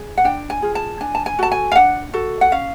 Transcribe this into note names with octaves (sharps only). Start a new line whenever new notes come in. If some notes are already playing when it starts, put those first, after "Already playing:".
Already playing: G#4
F#5
D4 G5
G#5
F4 G#4
A5
D4 G#5
A5
G#5
F#4 A4 A5
G#5
F5
D4 F#5
F#4 A4
F#5
C#4 F5